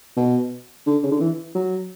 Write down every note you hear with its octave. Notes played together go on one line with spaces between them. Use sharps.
B2
D3
C#3
D3
E3
F#3